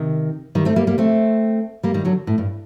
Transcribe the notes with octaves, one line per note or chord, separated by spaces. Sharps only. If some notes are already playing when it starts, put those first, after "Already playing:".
Already playing: C3 D#3
D#3 G3
A3 C4
G3 A#3
G3 A#3
A3 C4
G3 A#3
D#3 G3
D3 F#3
A2
G2